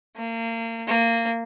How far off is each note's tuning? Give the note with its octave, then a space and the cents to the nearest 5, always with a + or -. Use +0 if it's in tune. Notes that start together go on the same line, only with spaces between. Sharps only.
A#3 -35
A#3 -20